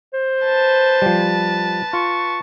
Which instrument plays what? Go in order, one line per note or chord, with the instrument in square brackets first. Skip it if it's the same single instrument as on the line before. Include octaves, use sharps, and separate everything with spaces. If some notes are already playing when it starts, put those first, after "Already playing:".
[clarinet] C5
[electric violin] B4 A5
[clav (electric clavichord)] F3 G3
[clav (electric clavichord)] F4 [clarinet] C#6